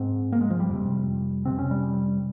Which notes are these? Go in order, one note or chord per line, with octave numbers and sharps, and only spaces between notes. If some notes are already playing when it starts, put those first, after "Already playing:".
Already playing: G#2 C4
A#3
G#3
F3
G3
F2 C3
F2 C3 C4
C#4
G3